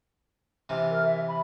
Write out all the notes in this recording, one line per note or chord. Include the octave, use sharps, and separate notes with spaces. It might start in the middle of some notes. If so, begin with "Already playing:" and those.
C3 E3 F4
A#4
E5
B5